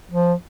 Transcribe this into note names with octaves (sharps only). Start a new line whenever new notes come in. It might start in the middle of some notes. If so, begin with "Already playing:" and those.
F3